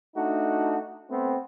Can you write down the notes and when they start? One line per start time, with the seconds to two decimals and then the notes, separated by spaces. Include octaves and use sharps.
0.16 A3 D4 D#4 F#4
1.10 A3 B3 C4